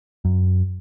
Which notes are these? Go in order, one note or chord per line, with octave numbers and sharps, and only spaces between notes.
F#2